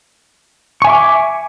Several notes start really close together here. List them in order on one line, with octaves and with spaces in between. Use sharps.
C#6 G#5 E5 D6